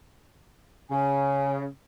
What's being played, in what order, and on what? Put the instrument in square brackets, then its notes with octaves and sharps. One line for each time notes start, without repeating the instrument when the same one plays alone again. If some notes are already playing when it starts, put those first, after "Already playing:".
[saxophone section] C#3 [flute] G#5